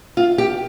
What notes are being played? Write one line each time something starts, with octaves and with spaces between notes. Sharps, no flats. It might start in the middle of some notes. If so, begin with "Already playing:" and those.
F4
G4